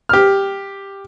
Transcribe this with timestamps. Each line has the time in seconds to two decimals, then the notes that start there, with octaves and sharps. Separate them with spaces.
0.09 G4 F6